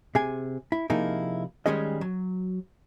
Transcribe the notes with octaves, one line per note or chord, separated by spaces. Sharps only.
C3 G#4 G#5
E4
C3 F3 A#3 D#4 E4 G#4
D#3 G3 G#3 C#4 G#4 D#5
F#3